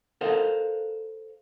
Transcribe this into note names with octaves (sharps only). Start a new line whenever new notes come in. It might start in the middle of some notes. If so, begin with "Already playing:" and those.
A4 A#4 C5 D#5 F5 F#5